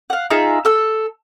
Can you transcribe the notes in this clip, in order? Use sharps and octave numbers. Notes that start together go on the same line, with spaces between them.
F5 F#5
D#4 F4 G#4 E5
A4 E6